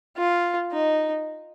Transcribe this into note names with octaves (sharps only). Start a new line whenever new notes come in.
F4
D#4